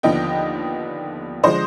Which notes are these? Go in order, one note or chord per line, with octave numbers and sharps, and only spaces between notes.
D#2 D3 F3 B3 D#5 G5
D3 F3 G#3 C5 D#5